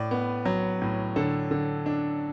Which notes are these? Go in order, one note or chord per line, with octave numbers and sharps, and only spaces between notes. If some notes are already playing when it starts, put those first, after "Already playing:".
Already playing: A2 D5
B3
F#3
A2
D3 A4
D3
D4